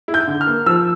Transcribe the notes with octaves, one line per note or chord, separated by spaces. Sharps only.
E4
G6
D3
F6
A#3
F3 E6